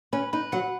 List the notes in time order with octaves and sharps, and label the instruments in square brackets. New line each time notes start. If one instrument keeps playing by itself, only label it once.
[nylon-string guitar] C#4 [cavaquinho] B4
[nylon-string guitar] D#4 [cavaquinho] B4
[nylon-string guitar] F#3 [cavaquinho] F#5